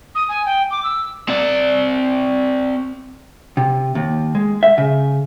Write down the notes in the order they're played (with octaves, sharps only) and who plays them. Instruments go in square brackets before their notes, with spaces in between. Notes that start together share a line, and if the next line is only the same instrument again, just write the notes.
[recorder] D#6
G#5
G5
D6
E6
[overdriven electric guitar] C4 D5
[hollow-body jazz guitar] C3
D#2
G#3
E5
C#3